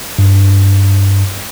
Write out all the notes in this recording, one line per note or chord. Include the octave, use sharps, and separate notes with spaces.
G2